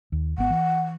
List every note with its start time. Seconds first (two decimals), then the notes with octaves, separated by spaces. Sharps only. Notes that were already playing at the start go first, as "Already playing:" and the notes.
0.12 D#2
0.38 G#1 B3 F#5
0.50 E3